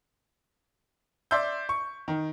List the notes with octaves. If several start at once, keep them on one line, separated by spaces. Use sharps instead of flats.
D5 E5 C6 E6 G6
C#6
D#3